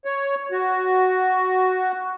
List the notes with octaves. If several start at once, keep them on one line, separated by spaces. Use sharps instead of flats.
C#5
F#4